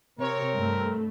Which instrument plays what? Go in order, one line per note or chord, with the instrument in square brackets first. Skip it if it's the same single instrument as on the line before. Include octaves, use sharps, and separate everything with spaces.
[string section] C3 C#5 [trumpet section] C4 A#4
[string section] G2 A3